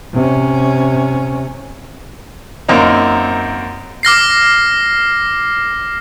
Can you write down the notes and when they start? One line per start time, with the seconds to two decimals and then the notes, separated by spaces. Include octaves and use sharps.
0.14 C3 C#4
2.68 F#2 A#3 C4 D#4
4.03 D6 F6 A#6 C7